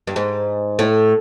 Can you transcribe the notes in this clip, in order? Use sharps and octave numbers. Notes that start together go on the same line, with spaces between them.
G2
G#2
A2